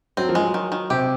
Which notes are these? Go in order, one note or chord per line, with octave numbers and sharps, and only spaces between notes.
F#3 C4
F3
F#3 G#3
D#3
D#3
C3 G4